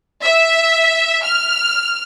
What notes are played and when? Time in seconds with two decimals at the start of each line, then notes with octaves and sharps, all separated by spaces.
0.22 E5
1.22 F6